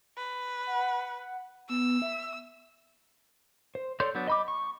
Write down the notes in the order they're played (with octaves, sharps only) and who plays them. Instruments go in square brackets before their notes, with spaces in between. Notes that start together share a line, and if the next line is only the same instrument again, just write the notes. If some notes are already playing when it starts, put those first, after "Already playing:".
[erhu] B4
[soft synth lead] F#5
[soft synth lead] B3 [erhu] E6
[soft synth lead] E5
[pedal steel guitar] C5
A4 C#5 D5 C6 G6
F#3 B3 D4 G6
D#5 B5 D6
C#6